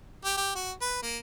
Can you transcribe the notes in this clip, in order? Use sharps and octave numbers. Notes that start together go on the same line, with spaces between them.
G4
G4
F#4
B4
A#3